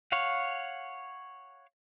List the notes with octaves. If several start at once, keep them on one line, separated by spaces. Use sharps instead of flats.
C#5 F5 F#5